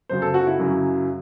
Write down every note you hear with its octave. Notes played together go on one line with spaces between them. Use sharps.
F#2 C#3 F#3 C5
A4
F#4
E4
F#2 C#3 F#3